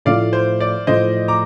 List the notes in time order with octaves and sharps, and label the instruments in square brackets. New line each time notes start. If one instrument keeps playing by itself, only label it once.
[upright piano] A2 F3 A3 [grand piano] D5 F5
[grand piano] C5
D5
[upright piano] A2 F3 A3 [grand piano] C5 D#5
[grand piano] A#5 D6